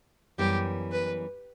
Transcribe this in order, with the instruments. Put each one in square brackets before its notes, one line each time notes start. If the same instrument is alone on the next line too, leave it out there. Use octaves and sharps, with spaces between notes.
[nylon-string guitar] F#2 E3 G3 B3 [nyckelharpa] G4
[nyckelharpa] B4